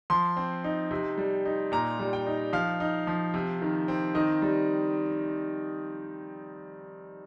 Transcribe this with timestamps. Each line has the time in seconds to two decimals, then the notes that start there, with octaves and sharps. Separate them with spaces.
0.10 F3 C6
0.37 C4
0.64 D#4
0.91 C3
1.18 G3
1.45 D#4
1.72 A#2 A#5
1.99 G3
2.13 G5
2.26 D#4
2.53 F3 F5
2.80 D#4
3.07 F3
3.34 C3
3.62 D#3
3.88 C4
4.15 D#3 D#5
4.42 G3